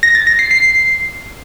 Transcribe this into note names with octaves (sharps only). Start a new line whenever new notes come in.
A#6
A6
A#6
C7
C7